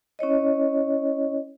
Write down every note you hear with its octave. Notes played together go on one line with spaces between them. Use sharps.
C#4 E4 C#5 D#5